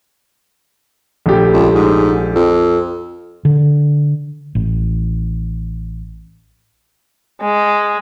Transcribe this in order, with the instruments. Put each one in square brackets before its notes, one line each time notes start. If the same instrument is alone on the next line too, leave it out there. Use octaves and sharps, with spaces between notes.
[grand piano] A#1 A3 G4
[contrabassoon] C#2
G#2
F2
[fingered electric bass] D3
A1
[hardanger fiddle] G#3